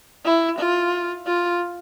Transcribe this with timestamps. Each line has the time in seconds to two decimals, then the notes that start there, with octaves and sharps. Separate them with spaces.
0.25 E4
0.59 F4
1.27 F4